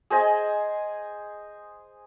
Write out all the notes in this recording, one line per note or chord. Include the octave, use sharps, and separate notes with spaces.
G#4 C5 D#5 G#5